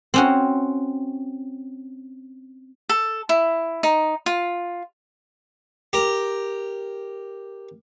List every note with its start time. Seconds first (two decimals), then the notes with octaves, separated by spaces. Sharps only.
0.14 C4 C#4 F#4
2.89 A4
3.29 E4
3.83 D#4
4.26 F4
5.93 G4 A#4